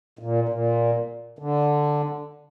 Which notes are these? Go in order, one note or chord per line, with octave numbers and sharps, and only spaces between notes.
A#2
A#2
D3